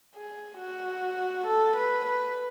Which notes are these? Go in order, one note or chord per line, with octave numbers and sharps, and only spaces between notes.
G#4
F#4
A4
B4
B4